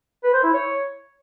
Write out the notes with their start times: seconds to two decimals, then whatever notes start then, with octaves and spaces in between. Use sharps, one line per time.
0.24 B4
0.34 C5
0.44 E4
0.54 C#5